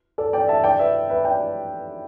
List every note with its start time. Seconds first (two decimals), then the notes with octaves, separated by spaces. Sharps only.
0.18 A4 D5
0.33 D5 G5
0.48 E5 A5
0.64 D5 G5
0.79 B4 E5
1.10 B4 E5
1.25 D5 G5